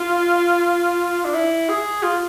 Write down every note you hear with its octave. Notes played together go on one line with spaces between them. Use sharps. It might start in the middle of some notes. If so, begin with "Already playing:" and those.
Already playing: F4
D4
E4
G#4
F4